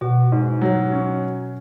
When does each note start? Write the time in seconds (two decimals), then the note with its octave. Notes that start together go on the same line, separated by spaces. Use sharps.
0.01 B2 F#4
0.32 G#2
0.62 F#3
0.92 C#4